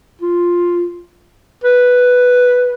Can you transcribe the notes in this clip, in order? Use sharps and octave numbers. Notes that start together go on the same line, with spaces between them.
F4
B4